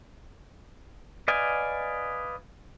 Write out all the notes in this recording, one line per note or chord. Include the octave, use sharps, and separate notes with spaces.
B4 D5 D#5 F5 G#5